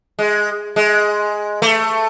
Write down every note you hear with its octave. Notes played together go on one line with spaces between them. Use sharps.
G#3
G#3
A3